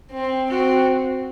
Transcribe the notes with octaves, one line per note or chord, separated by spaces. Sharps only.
C4
C4 F#4